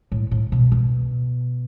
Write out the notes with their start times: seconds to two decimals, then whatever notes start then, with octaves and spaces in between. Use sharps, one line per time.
0.12 A2
0.31 A2
0.52 B2
0.72 B2